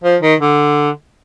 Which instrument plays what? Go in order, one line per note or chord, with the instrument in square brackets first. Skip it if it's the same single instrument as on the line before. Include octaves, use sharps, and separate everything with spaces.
[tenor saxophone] F3
D#3
D3